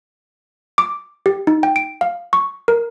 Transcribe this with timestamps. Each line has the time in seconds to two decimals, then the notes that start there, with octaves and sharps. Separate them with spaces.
0.78 D6
1.26 G4
1.47 D#4
1.63 G5
1.76 D7
2.01 F5
2.33 C#6
2.68 A#4